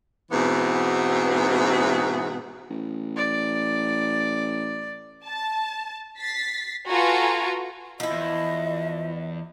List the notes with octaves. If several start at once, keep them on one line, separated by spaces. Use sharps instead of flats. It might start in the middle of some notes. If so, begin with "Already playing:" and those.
G#2 B2 E3 B3 C4
A1
D5
A5
A6 B6 C7
F4 F#4 A4 B4 G#5 A#5
F3 E4 D#5
E2